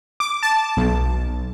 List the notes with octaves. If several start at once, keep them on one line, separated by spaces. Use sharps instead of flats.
D6
A5
B1